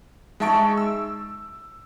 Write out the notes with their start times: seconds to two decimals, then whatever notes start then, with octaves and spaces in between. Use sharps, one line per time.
0.40 G#3 D#4 E5 A5 C#6 D7
0.77 E6